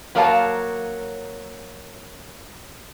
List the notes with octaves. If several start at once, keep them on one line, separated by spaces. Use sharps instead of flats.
F#3 A#3 A#4 C#5 F5 A5